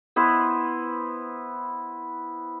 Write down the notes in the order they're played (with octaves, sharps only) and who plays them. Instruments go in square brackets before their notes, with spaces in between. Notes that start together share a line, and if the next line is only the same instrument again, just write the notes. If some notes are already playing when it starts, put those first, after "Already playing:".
[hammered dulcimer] B3 E4 B4 C5